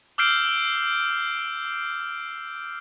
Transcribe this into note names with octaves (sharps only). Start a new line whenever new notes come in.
D6 E6 F6 G6 C7 D7